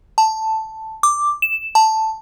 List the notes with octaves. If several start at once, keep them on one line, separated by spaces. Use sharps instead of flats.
A5
D6
E7
A5